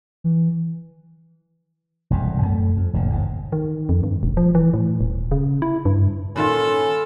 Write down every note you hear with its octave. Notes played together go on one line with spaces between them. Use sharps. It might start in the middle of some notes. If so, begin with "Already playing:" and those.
E3
E1 C2 F2 G#2
F#2 A3
F2
F1 A#2 D3
G1 D#2 G#2
D#3
F2
G2
E1
F3
E3
A2
D#1
C#3
E4
G2
A#2 D#3 C#4 F4 A4 B4